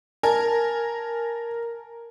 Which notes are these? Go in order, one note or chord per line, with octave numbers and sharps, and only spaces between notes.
A#4 G#5 A5